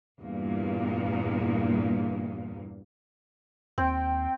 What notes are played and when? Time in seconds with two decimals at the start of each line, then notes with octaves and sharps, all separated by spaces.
0.20 E2 G2 A#2 A#3
3.78 D#2 C4 G5